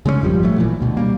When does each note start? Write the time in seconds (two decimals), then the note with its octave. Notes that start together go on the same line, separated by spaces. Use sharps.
0.06 C#3 G#3 A3 C#4
0.21 G#1 F2 F3 G3
0.43 A1 F#3 A3
0.58 A#2 E3
0.81 D2 B2
0.97 G3 A#3